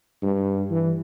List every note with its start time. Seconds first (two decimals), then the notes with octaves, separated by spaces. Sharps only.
0.22 G2
0.71 E3